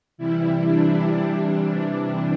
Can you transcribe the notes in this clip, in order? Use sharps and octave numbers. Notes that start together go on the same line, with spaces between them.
C3 E3 G3 E4
D4
C3 E3 G3